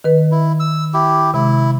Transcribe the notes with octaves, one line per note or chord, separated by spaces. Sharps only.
D#3 B4
E4
E6
E4 G4
C3 G#3 E4